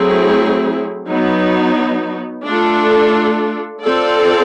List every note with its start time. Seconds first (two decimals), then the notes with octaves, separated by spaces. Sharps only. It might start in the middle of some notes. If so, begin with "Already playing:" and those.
Already playing: F#3 A3 C4 E4 G#4
1.07 F#3 B3 D#4
2.45 A3 D4 F4 A4
3.83 C4 F4 A4 D5